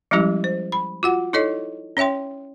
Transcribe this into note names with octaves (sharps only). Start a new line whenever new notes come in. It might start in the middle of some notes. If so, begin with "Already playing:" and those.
F3 G3 G#3 C#4 E4 G4
C5
B5
F4 F#4 F#5
D#4 E4 A4 C#5 D#5
C#4 C#5 E5 G5 C6